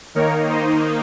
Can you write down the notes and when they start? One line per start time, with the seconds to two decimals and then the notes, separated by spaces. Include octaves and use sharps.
0.15 D#3 A#3 D#4 A#4 C#5
0.49 C5 D#5